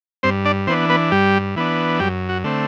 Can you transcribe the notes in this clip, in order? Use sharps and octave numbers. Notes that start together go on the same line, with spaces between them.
G2 C4 C5
D4 D5
E3 B3 C4 D4 C5
B3 B4
G2 G3 G4
E3 B3 D4
F#2 G3 G4
F#4
D3 A3 C4